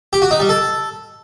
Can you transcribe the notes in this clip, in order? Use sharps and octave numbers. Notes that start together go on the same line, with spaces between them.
G4
F#4
D#4
G3
A4